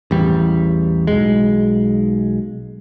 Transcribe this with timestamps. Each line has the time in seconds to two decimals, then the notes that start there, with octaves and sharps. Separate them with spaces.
0.11 A1 E2 G3
1.07 B1 G#3